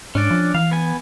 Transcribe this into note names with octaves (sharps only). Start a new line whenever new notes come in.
G#2 C#4 D4 D5
F3
E3 F5
B3 G#5